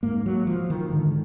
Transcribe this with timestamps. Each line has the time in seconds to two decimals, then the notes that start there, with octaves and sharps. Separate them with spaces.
0.03 G#2 A#3
0.26 F#3
0.47 F3
0.70 D#3
0.92 G#2 D3